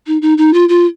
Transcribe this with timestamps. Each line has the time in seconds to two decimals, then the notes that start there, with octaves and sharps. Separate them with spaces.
0.07 D#4
0.22 D#4
0.38 D#4
0.54 F4
0.69 F4